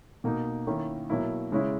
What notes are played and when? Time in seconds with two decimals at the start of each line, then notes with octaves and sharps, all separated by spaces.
0.24 B2 A#3 D#4
0.67 D#3 A#3 C#4 E4
1.10 B2 F#3 A#3 E4
1.52 C#3 G#3 C#4 E4